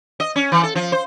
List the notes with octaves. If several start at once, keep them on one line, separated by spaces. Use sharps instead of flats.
D#5
C#4
E3
A4
F3
C5